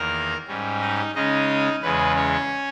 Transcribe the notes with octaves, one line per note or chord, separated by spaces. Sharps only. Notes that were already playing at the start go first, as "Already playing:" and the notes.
Already playing: E2 D#3 A#3 A#4 A#5
G#2 G3 C#4
D#4 D#5
C#3 G#3 C#4 D#4 D#5
E2 C#3 G#3 C#4 B4
C#4 C#5